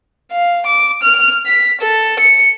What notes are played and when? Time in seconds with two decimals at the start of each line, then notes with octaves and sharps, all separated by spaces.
0.32 F5
0.66 D6
1.03 F6
1.46 B6
1.81 A4
2.20 C#7